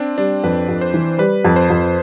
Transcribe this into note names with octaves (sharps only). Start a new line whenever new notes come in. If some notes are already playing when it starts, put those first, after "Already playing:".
Already playing: C4 D4
G3 D4
F2 B4
F2
C5
E3
G3 B4
F2
C5
F2